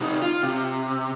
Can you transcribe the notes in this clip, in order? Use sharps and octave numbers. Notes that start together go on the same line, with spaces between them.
C3 D#4
F4
C3